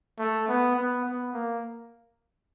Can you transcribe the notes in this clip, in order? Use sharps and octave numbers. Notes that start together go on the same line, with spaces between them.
A3
B3
B3
B3
A#3